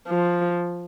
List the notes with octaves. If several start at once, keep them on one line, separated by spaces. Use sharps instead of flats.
F3